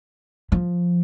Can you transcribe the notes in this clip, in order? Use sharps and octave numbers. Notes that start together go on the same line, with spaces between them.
F3